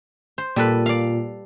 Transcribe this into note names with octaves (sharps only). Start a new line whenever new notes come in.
C5
A#2 G3 A4 B4
D5 F5